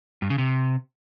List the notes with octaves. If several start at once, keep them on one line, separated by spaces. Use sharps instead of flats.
G2
C#3
C3